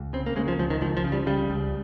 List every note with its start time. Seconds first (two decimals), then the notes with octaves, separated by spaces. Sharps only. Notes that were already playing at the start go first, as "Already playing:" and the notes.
Already playing: C#2
0.13 C#3 C4
0.26 A#3
0.36 C#3 G#3
0.48 F3
0.59 C#2 F3
0.70 D#3
0.81 C#2 F3
0.97 F3
1.04 C#3
1.12 G3
1.27 C#3 G3
1.50 C#2